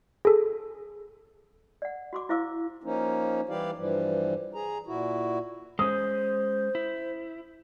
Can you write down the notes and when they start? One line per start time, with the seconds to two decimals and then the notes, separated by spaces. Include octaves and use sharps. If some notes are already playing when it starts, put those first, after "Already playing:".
0.25 G#4 A4
1.82 D5 F#5
2.13 F#4 C6 D6
2.29 E4 C5 F5 D6 E6
2.84 F3 A#3 C#4 D#4
3.49 E3 G3 E4 G4 D5 F5
3.77 G2 E3 F3 G3
4.54 G#4 A#5
4.87 A#2 E4 F#4
5.79 G#3 C#4 C5 D#6
6.75 E4